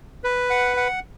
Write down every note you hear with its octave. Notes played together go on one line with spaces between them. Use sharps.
B4
F#5
F#5